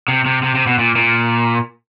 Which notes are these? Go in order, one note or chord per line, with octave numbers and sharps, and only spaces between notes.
C3
C3
C3
C3
B2
A#2
A#2